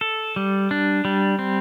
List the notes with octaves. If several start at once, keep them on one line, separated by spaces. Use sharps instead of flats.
A4
G3
D4
G3
C4